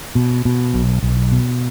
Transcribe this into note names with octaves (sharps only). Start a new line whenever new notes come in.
B2
B2
B1
B1
B2